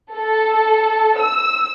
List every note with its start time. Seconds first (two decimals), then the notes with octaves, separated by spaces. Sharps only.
0.15 A4
1.20 E6